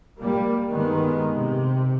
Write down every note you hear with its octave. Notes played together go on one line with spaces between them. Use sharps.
G3 A#3
G2 D#3 G#3 B3
C3